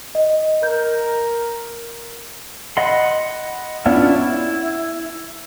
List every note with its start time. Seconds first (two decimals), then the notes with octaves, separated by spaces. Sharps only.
0.15 D#5
0.63 A#4 G6
2.77 D#5 F#5 B5 C6
3.86 B3 C#4 D4 E4 F4
4.16 E4